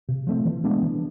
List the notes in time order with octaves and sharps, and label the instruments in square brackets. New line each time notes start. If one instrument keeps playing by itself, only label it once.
[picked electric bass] C3
F3 A3 C4
E3
G#3 B3 D4
E3